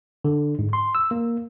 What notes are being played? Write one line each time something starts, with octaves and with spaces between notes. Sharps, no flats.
D3
G#2
C6
E6
A#3